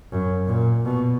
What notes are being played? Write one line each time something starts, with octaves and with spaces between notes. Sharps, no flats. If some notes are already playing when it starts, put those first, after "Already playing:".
F#2
A#2
B2